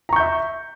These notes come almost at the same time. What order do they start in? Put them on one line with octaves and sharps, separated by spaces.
A#5 C#6 G6 E5